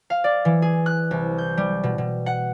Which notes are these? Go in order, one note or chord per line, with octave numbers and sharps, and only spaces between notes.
F5
D5
E3
G#4
F#6
C2
G6
G3
B2
B2
F#5